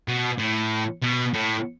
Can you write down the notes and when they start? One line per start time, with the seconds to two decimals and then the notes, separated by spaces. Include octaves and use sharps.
0.08 B2
0.39 A2
1.02 B2
1.34 A2